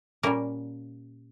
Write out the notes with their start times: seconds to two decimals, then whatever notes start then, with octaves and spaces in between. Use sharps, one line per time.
0.23 A#2 G3 A#3 C#4 A#4